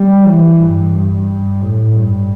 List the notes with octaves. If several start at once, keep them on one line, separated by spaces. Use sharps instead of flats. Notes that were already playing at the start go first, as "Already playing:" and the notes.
Already playing: G3
E3
G2
G2
A2
G2